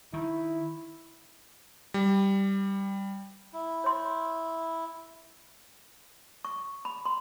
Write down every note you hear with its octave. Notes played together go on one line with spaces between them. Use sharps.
D#3 E4
G3
E4
C#5 C6
C#6
B5
C6